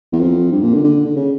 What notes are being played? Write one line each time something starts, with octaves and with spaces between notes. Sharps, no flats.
E2
F2
G2
A#2
D3
D3
D3
C#3